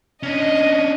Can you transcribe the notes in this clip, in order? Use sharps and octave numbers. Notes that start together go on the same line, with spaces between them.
C#4 D4 D#5